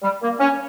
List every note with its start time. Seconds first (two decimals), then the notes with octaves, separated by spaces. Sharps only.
0.02 G3
0.22 A#3
0.40 C#4